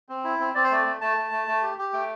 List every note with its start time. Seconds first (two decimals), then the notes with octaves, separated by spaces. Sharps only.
0.09 C4
0.24 E4
0.40 C4
0.55 C4 D5
0.64 C5
0.70 A3 D5
0.86 A3
1.01 A3 A5
1.17 A3
1.31 A3
1.48 A3
1.62 G4
1.78 G4
1.93 A3 G5